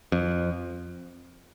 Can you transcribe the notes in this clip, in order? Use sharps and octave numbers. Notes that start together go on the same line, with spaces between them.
F2